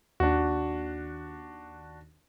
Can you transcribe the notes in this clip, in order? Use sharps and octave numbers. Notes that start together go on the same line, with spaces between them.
D#2 D4 F#4